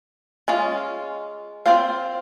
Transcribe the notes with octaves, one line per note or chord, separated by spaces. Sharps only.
G#3 C#4 F4
C4 F4 C5 F5